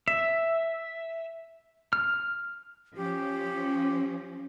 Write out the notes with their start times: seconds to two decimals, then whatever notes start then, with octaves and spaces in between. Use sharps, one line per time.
0.08 E5
1.93 F6
2.96 F3 C#4 G4